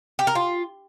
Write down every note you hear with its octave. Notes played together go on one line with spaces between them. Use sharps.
G4
A#4
F4